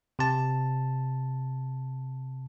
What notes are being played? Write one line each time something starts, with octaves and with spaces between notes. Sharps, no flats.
C3 A5